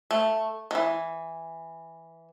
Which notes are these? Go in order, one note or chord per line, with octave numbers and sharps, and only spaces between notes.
A3
D#3 E3